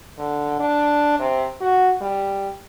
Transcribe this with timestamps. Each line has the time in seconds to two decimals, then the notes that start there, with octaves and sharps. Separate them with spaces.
0.18 D3
0.60 D4
1.19 C3
1.61 F#4
2.01 G3